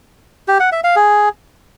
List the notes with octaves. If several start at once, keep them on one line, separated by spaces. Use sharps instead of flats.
G4
F#5
E5
F5
G#4